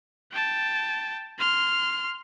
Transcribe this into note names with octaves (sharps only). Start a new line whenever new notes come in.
G5 A5
C6 F6